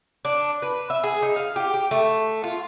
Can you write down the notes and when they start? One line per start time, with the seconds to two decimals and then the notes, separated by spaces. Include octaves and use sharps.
0.25 D4
0.62 B4
0.90 E5
1.03 G#4
1.22 D#4
1.36 F5
1.56 G4
1.74 G4
1.91 A3
2.44 F4